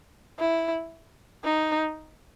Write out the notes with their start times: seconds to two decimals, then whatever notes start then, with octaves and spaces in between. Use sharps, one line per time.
0.40 E4
1.44 D#4